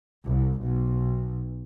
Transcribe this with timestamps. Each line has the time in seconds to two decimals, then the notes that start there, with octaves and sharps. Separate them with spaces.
0.25 C2
0.62 B1